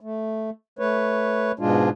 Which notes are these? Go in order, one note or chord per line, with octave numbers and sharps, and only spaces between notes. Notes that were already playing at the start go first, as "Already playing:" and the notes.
A3
A3 B4 C#5
G#2 B2 G#3 D4 F4